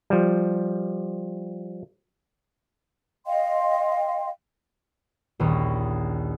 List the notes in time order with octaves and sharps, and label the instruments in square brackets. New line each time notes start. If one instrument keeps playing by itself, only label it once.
[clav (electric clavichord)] F3 G3
[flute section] D#5 F5 G5 C6
[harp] A#1 D#2 C#4